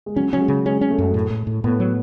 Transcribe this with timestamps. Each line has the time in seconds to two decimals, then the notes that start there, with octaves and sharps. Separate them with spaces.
0.06 G#3
0.16 F#3 C#4
0.33 F#3 C#4
0.40 G#3
0.48 C#3
0.66 G#3 C#4
0.81 C#4
0.90 A3
0.98 F#2
1.14 A2
1.30 A2
1.47 A2
1.64 A2 B3
1.80 F#3